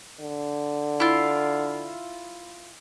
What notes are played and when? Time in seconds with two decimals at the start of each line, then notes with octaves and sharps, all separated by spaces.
0.20 D3
1.00 E4 F4